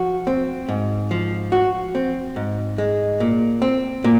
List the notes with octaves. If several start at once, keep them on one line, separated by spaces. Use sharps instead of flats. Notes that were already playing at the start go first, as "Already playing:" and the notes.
Already playing: F3 F#4
C4
G#2
F3
F#4
C4
G#2
G#3
A#2
C4
A#2